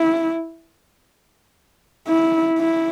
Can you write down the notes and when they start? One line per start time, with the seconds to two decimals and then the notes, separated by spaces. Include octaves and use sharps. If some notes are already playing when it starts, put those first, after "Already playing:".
Already playing: E4
2.09 E4
2.59 E4